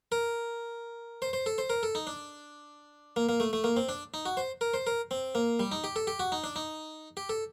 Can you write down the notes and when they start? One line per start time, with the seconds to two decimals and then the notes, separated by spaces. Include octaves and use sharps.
0.12 A#4
1.22 C5
1.33 C5
1.46 A4
1.58 C5
1.70 A#4
1.83 A4
1.95 D#4
2.07 D4
3.16 A#3
3.29 A#3
3.40 A3
3.53 A3
3.64 A#3
3.77 C4
3.89 D4
4.14 D#4
4.26 F#4
4.37 C5
4.61 A#4
4.74 C5
4.87 A#4
5.11 C4
5.35 A#3
5.60 G3
5.72 D#4
5.84 G4
5.96 A4
6.07 G4
6.20 F#4
6.32 D#4
6.44 D4
6.56 D#4
7.17 G4
7.29 A4